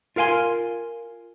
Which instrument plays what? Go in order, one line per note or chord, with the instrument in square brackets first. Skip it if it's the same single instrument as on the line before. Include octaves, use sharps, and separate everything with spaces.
[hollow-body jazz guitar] F4 A#4 F5 G#5 C6